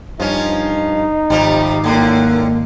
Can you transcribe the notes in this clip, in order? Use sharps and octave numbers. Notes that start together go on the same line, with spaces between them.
G2 F3 C#4 D#4
G#1 C3 F3 G3
A2 D3 A#3